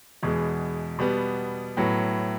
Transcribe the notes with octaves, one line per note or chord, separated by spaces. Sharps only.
E2 B2 G#3
B2 G3 B3
A2 F#3 B3